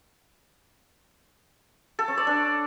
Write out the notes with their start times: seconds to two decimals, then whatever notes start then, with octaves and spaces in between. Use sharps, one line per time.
1.99 A4
2.08 C#4
2.17 D5
2.27 D4